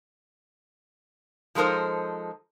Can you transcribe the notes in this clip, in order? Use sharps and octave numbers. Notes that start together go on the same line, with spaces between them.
F3 G#3 D#4 A4 A#4 C5